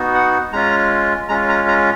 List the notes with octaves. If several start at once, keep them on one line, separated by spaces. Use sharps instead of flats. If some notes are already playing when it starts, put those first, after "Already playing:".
Already playing: B3 D#4 F#4
F#5
G#3 C#4 F4 A#5
G#3 C#4 F4 A#5
A#5
A#5